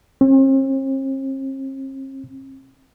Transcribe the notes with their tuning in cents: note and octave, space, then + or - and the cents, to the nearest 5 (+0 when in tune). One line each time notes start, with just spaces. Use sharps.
C4 +45